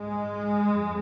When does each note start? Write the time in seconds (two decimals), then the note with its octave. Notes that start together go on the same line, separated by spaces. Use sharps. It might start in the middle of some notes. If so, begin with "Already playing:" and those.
Already playing: G#2 G#3
0.70 F2